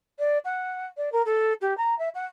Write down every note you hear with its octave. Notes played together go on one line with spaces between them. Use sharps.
D5
F#5
D5
A#4
A4
G4
A#5
E5
F#5